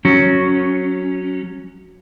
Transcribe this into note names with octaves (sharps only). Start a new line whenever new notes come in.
F#3 C#4